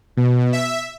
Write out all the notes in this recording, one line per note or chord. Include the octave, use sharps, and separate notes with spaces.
B2
E5